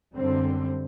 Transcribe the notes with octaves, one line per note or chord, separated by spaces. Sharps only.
F#2 D3 G3 C4